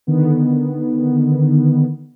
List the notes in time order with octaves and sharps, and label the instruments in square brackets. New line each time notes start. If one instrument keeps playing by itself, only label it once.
[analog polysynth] D3 D#3 B3